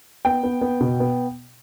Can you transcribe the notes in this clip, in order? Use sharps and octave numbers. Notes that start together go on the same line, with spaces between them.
B3 G5
B3
B3
B2
B3